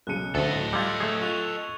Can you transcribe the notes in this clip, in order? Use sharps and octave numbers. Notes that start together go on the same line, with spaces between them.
B1 C#3 F#6 C#7 D#7
D2 A4 D#5
A2
G3 F4 E6 G#6 A6
A3 G#4
F4 C#6 F#6 F7